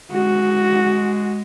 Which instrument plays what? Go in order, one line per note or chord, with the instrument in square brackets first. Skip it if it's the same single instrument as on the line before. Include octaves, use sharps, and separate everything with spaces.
[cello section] G#3 [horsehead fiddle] F#4